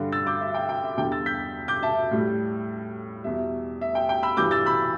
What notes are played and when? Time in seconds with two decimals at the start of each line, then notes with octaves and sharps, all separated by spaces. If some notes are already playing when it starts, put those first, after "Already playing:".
Already playing: G2 D3 G3
0.12 E6 A6
0.27 D6 G6
0.41 E5
0.54 G5
0.69 G5
0.84 E5
0.97 E2 D3 G3 G5
1.12 E6 A6
1.26 G6 B6
1.68 D6 G6
1.83 E5 A5
2.11 A2 G3
3.24 E2 B2 G3 E5
3.81 E5
3.95 G5
4.09 G5
4.23 B5 E6
4.37 G2 E3 G3 D6 G6
4.51 E6 A6
4.66 B5 E6